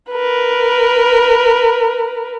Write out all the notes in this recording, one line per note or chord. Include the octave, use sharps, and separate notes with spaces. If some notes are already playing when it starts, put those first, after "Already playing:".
A#4 B4